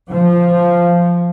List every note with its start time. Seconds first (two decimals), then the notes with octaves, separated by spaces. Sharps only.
0.10 F3